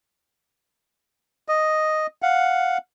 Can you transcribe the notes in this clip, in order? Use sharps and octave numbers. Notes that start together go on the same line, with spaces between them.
D#5
F5 F#5